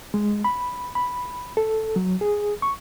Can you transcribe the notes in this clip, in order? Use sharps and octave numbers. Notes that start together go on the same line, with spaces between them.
G#3
B5
B5
A4
F#3
G#4
C#6